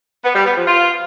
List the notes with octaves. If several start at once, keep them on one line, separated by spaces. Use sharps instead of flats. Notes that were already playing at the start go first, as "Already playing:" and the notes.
B3
G3
B3
F3
F4